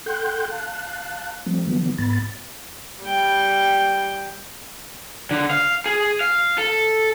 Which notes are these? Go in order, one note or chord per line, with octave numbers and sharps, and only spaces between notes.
A4 F#5 G5 C6 F#6 G6
F5 A5 F#6
F3 G3 A3 C4
D3 E3 F#3 B3
G#2 B3 B5 A6
G3 G5
D3
F5
G#4
F5
A4